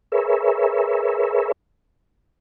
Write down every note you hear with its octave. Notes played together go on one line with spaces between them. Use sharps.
G#4 A#4 B4 C#5 E5